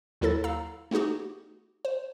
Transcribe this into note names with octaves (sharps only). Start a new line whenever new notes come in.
D#2 F#3 E4 A4 A6
F5 A#5 E6
A3 B3 D#4 F#4 G4
C5